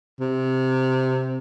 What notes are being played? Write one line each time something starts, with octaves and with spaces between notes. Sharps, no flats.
C3